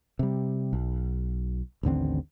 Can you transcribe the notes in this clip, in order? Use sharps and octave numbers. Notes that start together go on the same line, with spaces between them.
C3 G3
B1
A1 D#2 D3 C4